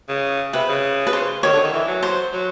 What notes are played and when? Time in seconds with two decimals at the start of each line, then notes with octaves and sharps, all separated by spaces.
0.09 C#3
0.53 C3 B4
0.69 C#3
1.07 B4
1.13 C5
1.43 D#3 C#5
1.53 D3
1.63 D#3
1.73 E3
1.88 F#3
2.03 C5
2.32 F#3